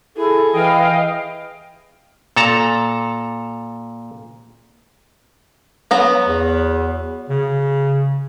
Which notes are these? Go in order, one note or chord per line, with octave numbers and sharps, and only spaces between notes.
E4 G#4 A4
E3 D#5 F5 G5
A#2 A4 A5 A#5
F#3 B3 A#5
E2
C#3